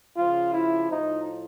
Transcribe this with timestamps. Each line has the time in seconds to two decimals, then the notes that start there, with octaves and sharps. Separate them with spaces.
0.17 C#3 F3 F4
0.54 E4
0.90 A2 F3 D#4